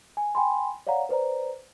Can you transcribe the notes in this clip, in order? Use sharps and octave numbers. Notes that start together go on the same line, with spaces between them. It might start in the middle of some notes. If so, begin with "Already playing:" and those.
G#5
G5 G#5 B5 C6
C#5 D5 F5 F#5 A#5
B4 C5 D5 A#5